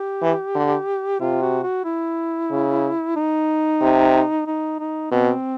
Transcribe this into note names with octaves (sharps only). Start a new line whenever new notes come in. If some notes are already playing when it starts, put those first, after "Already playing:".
Already playing: G4
E3
D3
C3 F4
F#4
F#4
E4
C#3
D#4
C3
D#4
D#4
B2 C4